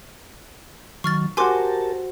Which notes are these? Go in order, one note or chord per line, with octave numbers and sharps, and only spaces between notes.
D#3 F#3 C#6 F6 A6
F#4 G4 A#4 C5 G#5 A5 C6 D6